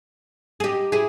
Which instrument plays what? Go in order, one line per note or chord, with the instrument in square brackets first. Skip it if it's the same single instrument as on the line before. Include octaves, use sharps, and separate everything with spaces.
[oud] G#4
D#4 G4
E4 G#4